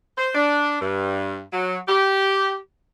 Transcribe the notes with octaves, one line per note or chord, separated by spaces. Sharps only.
C5
D4
G2
F#3
G4